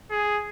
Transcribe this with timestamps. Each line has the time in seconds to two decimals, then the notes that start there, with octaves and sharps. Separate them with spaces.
0.11 G#4